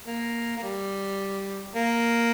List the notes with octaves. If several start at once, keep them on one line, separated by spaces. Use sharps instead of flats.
A#3
A#3
G3
A#3